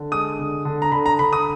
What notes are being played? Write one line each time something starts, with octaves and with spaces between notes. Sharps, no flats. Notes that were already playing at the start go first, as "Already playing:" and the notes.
Already playing: D3
G#3 D#6
D3
D3
A#5
D3 B5
A#5
D3 B5
D#6